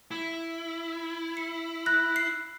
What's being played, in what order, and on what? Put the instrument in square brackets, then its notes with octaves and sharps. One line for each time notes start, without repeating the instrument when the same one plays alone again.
[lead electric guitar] E4
[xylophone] C#7
[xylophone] B5 A#6 [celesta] F#6
[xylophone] C7